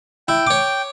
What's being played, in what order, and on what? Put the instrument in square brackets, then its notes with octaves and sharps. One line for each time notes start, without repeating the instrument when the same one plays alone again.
[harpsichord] E4 [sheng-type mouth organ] G5
[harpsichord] C#5 D6